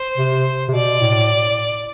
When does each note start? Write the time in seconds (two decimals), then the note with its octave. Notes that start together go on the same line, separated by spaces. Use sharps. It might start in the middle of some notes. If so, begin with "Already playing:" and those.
Already playing: C5
0.17 C3
0.69 C3
0.73 B2 D5
1.01 A2